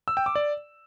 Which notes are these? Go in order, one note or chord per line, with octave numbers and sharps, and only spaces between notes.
E6
G5
D6
D5